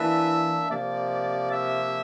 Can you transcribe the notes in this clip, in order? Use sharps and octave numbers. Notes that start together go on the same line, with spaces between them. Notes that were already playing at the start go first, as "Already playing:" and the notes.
Already playing: E3 A#3 D4 E5
C3 F3 A#3 D5
E5